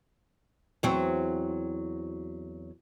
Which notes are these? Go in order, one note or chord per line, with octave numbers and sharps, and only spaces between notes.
E2 F#3 C4